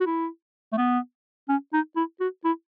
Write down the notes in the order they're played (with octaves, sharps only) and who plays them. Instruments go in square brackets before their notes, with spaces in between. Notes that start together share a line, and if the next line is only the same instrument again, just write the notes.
[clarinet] F#4
E4
A3
B3
C#4
D#4
E4
F#4
E4